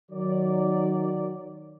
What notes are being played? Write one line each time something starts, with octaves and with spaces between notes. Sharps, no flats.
D#3 F#3 D5